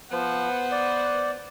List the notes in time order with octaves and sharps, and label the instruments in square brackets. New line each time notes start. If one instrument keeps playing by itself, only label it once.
[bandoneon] F3 [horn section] B3 C5 F#5
[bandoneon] D5